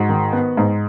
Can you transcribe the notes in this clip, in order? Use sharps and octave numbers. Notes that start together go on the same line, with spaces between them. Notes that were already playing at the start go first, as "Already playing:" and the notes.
Already playing: G#2 F#4
D#3
B3
G#2